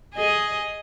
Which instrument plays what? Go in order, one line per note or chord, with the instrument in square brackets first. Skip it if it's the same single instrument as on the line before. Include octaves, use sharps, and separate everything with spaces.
[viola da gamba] G#4 D#5